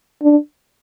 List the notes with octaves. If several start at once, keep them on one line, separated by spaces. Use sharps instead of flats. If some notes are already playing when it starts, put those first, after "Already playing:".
D4